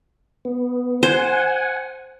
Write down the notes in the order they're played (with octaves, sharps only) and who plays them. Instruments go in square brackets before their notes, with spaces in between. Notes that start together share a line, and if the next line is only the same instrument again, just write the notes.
[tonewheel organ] B3
[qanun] C5 [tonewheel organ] F#5 G#5